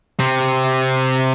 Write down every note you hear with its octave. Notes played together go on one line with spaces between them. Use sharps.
C3 C4